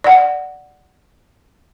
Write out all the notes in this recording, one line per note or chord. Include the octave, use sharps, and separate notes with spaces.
D5 F#5